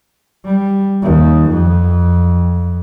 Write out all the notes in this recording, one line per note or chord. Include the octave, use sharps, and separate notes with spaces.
G3
D#2
F2